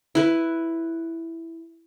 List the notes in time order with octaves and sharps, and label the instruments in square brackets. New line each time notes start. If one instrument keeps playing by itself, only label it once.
[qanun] E4 B4